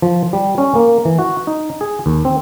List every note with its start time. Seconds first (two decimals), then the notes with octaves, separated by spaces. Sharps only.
0.02 F3
0.33 G3
0.58 C#4
0.75 A#3
1.05 E3
1.19 F#4
1.47 D#4
1.81 G#4
2.06 D#2
2.25 C4